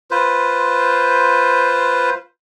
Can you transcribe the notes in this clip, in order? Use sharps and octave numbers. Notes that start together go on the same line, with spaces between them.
F4 B4 C5